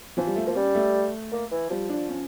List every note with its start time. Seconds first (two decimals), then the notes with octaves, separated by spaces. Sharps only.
0.17 E3 F3
0.27 G3
0.36 A3
0.46 F3 A#3
0.55 G3 C#4
0.75 A3
1.32 A#3
1.52 E3
1.70 F3 G3
1.90 D4
2.09 C#4